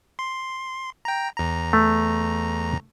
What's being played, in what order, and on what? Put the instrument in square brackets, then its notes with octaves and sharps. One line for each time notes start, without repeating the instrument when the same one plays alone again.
[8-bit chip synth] C6
G5 A#5
E2 A#5
[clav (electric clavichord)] A3